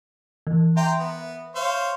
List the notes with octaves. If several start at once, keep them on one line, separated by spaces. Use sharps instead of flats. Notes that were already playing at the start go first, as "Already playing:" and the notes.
E3
E5 G5 A#5 C6
B3
C5 C#5 F5